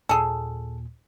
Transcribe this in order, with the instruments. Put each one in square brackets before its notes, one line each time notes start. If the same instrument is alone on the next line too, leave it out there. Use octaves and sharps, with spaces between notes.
[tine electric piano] D#2 A#2 [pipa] G#4 A4